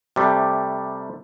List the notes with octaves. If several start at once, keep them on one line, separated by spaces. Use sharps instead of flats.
C3 G3 A3